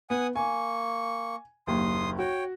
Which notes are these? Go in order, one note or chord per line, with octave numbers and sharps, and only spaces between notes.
B3 F#5 G#5 D#6
A#3 G#5 C#6
F#1 D#2 C6 D#6
F#4 C#5 G5